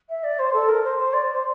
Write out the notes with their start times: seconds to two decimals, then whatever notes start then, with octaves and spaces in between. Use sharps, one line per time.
0.09 E5
0.23 D5
0.39 C5
0.53 A4
0.68 A#4
0.83 C5
0.98 C5
1.13 D5
1.32 C5